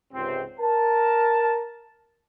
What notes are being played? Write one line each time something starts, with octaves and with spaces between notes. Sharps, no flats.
C#2 G#2 C3 C4
A#4 A5